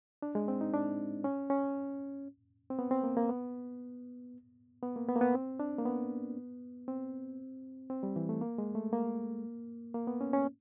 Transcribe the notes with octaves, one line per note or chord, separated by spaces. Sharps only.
D4
G#3
C4
D#4
D4
C#4
C#4
C4
B3
C4
A#3
A#3
B3
B3
A#3
B3
A#3
B3
C4
D4
A#3
B3
C4
C4
G3
E3
A3
A#3
G#3
A3
A#3
A#3
B3
C#4
C#4